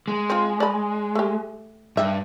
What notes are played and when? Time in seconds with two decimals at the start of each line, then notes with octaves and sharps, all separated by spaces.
0.08 G#3
0.30 C4 F4
0.60 D5 B5
1.15 A3 G4
1.97 G2 E5